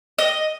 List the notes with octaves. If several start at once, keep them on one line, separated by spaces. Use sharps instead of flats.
D#5